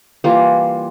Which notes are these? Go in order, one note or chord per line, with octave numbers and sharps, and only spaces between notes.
E3 G3 A#3 F4